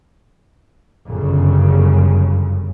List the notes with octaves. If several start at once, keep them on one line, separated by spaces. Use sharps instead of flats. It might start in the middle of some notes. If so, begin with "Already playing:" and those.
G1 F#2 C#3